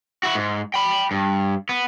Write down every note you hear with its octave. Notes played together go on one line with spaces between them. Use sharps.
E4 F#4
G#2
G5 B5
G2
B3